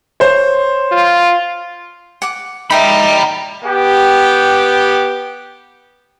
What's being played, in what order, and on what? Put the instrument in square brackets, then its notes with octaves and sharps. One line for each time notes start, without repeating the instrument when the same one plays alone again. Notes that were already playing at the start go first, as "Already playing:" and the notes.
[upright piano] C5 C#5
[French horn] F4
[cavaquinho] F#5 D6
[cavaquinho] D#4 D#5 E5 [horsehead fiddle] A#4 [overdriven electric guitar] G5 B5
[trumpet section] B3 G4